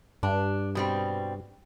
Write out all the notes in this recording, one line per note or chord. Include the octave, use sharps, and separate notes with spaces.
G2 D4
B2 G3 C4